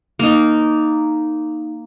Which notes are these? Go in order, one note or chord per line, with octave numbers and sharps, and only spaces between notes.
A#3 D#4